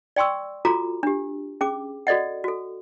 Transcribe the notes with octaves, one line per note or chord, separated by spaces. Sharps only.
D5 G5 C6 C#6 E6
F4 F#4 A4 A#5 D6
D4 G4
C#4 G#4 D6
F#4 A4 D5 D#5 F#5
F#4 A4